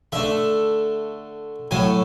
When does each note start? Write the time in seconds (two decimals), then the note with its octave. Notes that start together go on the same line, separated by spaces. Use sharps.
0.12 D3 A3 E5
1.71 A2 F#3 A3 G#5